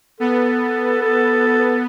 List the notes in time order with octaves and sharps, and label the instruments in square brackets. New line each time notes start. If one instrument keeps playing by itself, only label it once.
[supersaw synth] B3 [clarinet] A4
[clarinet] A4